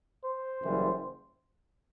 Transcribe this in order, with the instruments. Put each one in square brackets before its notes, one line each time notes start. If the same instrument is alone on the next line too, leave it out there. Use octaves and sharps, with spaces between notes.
[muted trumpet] C5
[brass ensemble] F#1 F#2 E3 G3